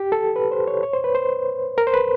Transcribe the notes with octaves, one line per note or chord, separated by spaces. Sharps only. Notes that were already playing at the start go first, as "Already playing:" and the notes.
Already playing: G4
A4
B4
C5
C#5
C#5
C5
B4
C5
A#4
C5
B4